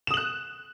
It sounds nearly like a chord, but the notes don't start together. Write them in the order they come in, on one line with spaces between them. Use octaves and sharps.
E7 D#6 F#7 F#6